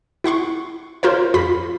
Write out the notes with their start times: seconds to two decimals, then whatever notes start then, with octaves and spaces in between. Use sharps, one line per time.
0.24 E4 F#5 C6 C#6
1.03 F4 A#4 C5 C#5
1.34 F2 F4 B5 A#6 B6